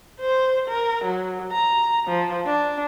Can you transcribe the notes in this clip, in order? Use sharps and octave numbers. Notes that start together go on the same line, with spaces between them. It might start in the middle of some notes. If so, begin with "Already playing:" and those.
C5
A#4
F#3
A#5
F3
D4